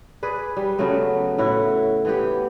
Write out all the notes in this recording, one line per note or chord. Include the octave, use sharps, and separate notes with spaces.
G#4 B4 D5
G3
C#3 F#3 A3 B3
A2 E4 F#4
E3 B3 G4